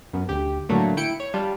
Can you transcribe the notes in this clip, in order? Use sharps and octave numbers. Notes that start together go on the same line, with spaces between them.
F#2 B3
D2 G4
A2 D3 F#3 A3 A#3
E4 G5 C#7 D7
C#5
G3 D4 F4